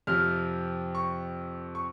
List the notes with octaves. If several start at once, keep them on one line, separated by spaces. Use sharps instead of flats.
F2 C3 F3 F6
C#6
C#6